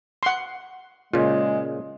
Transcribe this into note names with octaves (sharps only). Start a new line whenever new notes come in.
F#5 C6
A#2 C#3 G#3 F4